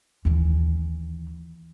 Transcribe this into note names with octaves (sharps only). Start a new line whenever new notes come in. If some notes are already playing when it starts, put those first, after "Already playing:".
D#2 E3